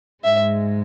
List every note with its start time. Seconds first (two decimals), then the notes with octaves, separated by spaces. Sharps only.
0.23 G#2 G#3 E5